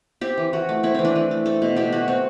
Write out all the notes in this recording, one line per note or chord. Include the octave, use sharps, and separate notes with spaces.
C4 G4
E3
E3 F#4
A3
C4 E4
E3 C4
D4
E3
A3
C4 A4
B2
B2 G4
A3 F#4
C4 F#4